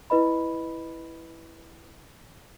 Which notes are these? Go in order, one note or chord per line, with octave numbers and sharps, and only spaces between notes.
E4 B4 D#5 B5